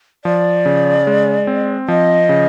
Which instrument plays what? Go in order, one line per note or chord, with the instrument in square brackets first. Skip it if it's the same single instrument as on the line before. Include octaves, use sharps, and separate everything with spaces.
[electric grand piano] F3 [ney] D5
[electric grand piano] C#3
G#3
C4
[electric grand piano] F3 [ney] D#5
[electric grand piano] C#3